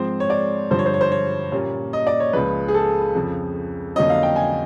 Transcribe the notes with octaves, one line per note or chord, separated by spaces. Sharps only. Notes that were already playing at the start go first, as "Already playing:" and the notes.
Already playing: G#2 F3 G#3 C4 C5
C#5
D5
G2 D3 F3 C5
C#5
C5
C#5
C5
C#5
A#2 G3 A#3 C#4
D#5
D5
C#5
C#2 C#3 F3 B4
G#4
A4
F2 C#3 F3
F2 D3 F#3 A#3 C#4 D#5
F5
G5
G#5